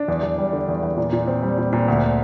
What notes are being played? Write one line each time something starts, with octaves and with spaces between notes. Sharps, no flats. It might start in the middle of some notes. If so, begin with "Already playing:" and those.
Already playing: D4
E2
E2
G3
D3
E2
E2
A#2
A#2
C4
G3
A#2
A#2
D2